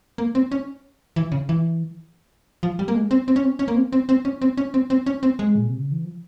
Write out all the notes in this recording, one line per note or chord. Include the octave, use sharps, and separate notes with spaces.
A#3
C4
C#4
E3
C#3
E3
F3
G3
A#3
G#3
C4
C4
C#4
C4
C#4
A#3
C4
C4
C4
C#4
C4
C#4
C4
C4
C#4
C4
G#3
A#2
C3
C#3
E3
F3